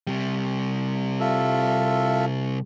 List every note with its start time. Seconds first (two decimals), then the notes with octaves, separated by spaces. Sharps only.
0.07 C3 G3
1.20 F4 A4 E5